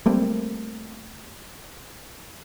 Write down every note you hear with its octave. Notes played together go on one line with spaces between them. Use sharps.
G3 A3 A#3 C4